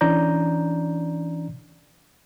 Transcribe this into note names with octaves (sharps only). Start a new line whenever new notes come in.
E3 C#4 D4 D5 A#5 G6